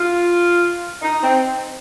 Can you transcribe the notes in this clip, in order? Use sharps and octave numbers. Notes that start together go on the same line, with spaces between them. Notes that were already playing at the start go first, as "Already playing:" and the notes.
Already playing: F4
D#4
C4